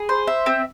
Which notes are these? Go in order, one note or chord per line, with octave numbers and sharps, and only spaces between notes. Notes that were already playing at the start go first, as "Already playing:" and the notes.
Already playing: G#4
C5
E5
C4